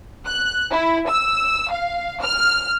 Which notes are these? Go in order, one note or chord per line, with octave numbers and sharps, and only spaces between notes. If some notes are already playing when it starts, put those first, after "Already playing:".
F#6
E4
E6
F5
F6